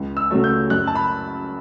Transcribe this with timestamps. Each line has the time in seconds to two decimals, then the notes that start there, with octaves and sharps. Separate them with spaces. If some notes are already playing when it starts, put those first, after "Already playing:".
Already playing: C#2
0.17 E6
0.31 C#3 F#3 A3
0.44 G6
0.70 F#2 F#6
0.87 A5
0.95 B5